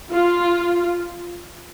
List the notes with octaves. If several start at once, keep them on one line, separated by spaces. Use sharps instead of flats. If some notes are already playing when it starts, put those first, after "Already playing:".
F4